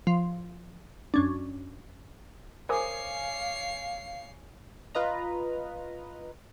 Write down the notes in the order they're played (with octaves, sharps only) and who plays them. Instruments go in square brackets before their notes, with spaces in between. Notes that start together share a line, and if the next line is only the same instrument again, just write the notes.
[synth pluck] F3
F#2 C#4 D4
[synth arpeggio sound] A#4 C5 D#6 [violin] C#5 C7 [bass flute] F5 [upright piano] G#5 D6
[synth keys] F4 B4 D#5 A#5